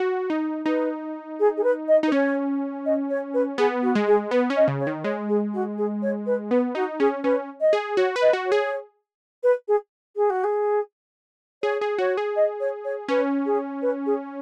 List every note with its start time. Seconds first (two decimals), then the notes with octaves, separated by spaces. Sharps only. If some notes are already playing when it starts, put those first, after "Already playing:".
Already playing: F#4
0.30 D#4
0.66 D#4 B4
1.39 G#4
1.57 G#4
1.63 B4
1.88 D#5
2.03 D#4
2.07 B4
2.12 C#4 C#5
2.85 D#5
3.10 C#5
3.34 B4
3.58 B3 G#4
3.82 F#4
3.95 G#3
4.07 G#4
4.31 B3 B4
4.50 C#4
4.56 D#5
4.68 C#3
4.80 C#5
4.87 D#3
5.04 G#3 C#5
5.29 G#4
5.53 F#4
5.78 G#4
6.02 C#5
6.26 B4
6.51 B3 B4
6.75 D#4 F#4
6.99 C#4 G#4
7.24 C#4 B4
7.60 D#5
7.73 G#4
7.97 F#4 C#5
8.16 B4
8.21 D#5
8.33 F#4
8.46 C#5
8.52 G#4
9.43 B4
9.68 G#4
10.16 G#4
10.30 F#4
10.43 G#4
11.62 G#4 C#5
11.81 G#4
11.98 F#4 C#5
12.17 G#4
12.36 D#5
12.60 C#5
12.84 C#5
13.08 C#4 B4
13.45 G#4
13.82 B4
14.06 G#4